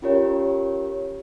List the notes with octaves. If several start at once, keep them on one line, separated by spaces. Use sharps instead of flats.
C#4 F4 G4 A#4 C#5